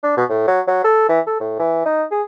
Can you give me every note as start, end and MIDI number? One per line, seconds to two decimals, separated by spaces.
0.03 0.16 62
0.17 0.24 47
0.29 0.46 45
0.48 0.61 54
0.67 0.83 54
0.84 1.06 69
1.09 1.20 52
1.27 1.39 69
1.40 1.59 45
1.60 1.82 52
1.86 2.04 63
2.12 2.22 68